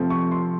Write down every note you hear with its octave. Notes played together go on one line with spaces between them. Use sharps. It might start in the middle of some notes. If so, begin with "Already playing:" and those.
Already playing: C3 F3 A3 C4
C#6
C6